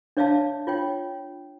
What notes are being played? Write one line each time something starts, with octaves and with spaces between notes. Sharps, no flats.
D4 C#5 D5 E5 F5 A5
F4 C#5 G5